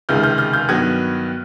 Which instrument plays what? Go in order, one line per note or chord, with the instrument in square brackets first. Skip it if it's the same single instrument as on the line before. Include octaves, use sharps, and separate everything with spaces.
[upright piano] C#2 C3 D#3 G#3 F6 G6
F6 G6
F6 G6
F6 G6
G2 D#3 F#3 B3 F#6 G#6